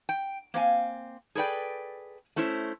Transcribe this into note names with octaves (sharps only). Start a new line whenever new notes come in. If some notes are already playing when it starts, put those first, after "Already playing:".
G5
A#3 C4 F5 G#5
G#4 A4 B4 D5 G5
A3 C#4 E4 C5